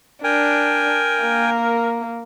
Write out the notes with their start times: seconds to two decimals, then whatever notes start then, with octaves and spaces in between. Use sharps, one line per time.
0.24 D4 A#4 G5 G#5
1.23 A#3